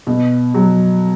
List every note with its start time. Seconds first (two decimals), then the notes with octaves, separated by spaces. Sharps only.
0.07 B2
0.54 F#3